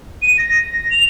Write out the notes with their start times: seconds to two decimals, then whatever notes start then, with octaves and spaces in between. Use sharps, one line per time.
0.22 D#7
0.38 A#6
0.90 F7